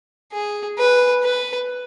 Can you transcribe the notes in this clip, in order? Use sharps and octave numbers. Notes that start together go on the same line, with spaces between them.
G#4
B4
B4